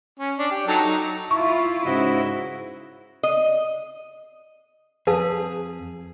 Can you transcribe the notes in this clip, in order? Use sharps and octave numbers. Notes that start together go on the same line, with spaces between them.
C#4
D4
G4
F#3 D#4 A4
D#4
E4 F4 C#6
G#2 C#3 E4 F#4 D#5
D#5
F2 G#4 B4 F5 A5